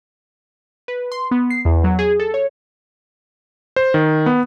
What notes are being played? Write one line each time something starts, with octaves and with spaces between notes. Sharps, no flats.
B4
C6
B3
C7
E2
F#3
G#4
A4
C#5
C5
D#3
B3